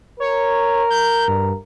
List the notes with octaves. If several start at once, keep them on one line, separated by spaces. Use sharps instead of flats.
A#4 C#5
G6
G2